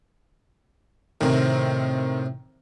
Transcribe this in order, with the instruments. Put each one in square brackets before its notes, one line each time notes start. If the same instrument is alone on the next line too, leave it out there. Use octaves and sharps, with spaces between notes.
[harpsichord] A2 C3 [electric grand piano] D#3 C4 A#4